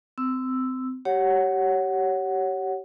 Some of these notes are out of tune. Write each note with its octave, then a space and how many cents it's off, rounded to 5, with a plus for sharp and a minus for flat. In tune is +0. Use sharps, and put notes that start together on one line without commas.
C4 -25 E6 +0
G4 -25 C#5 +0 F#5 +5